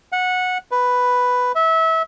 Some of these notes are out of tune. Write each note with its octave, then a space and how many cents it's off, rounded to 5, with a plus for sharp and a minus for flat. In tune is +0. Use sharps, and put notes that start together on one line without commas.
F#5 -15
B4 +5
E5 -25